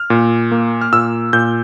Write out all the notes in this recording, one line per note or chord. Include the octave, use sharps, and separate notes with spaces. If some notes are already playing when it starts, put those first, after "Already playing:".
Already playing: F6
A#2
A#3
F6
A#2 E6
A#2 G6